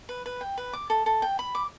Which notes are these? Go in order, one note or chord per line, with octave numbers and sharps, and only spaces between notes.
B4
B4
G5
B4
D6
A4
A4
G5
B5
D6